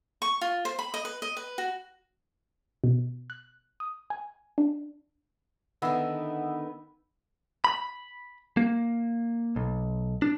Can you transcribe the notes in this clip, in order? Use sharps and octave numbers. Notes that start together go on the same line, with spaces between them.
C#6
F4
C5
B5
D#5
B4
D#5
B4
F#4
B2
F#6
D#6
G#5
D4
D3 D#3 B3 E5
B5
A#3
B1
D4